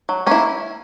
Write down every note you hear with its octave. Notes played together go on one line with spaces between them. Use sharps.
F#3
A#3 C#4 E4